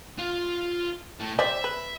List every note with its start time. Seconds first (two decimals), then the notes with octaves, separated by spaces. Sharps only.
0.19 F4
1.19 A2 A3
1.39 G3 C5 D5 E5
1.64 B4